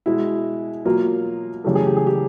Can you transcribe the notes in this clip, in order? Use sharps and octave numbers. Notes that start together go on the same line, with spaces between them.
B2 G#3 E4
B2 F#3 A#3 F4
F#2 C#3 E3 A3 G4
G#4
G4
G#4
G4